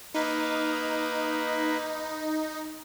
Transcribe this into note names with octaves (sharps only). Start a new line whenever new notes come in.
A#3 D#4 B4